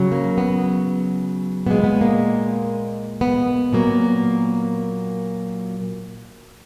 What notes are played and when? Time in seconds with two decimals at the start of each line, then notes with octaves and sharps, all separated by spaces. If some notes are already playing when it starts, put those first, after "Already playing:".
Already playing: C#3 F#3
0.12 A#3
0.38 B3
1.66 A#2 G#3 B3
1.84 B3
2.01 A#3
3.21 B3
3.73 A#2 F#3 A#3